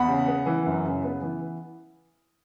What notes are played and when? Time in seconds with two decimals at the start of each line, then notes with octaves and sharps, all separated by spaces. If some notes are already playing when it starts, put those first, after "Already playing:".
Already playing: E2 F#5 B5
0.08 C#3
0.27 B3
0.46 E3
0.66 F#2
0.85 C#3
1.04 B3
1.22 E3